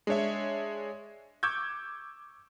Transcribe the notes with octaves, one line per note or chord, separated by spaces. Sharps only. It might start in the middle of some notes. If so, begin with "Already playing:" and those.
G#3 D4 C#5 E5
C#6 D6 E6 G6 G#6